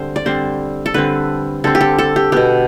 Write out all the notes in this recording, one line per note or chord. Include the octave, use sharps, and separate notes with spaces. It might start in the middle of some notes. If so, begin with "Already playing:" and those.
Already playing: D3 G3 C4 C5
D5
D3 G3 C4 C5
A4
D3 G3 C4 B4
D3 G3 C4 A4
G4
A4
A4
G4
B2 B3 G4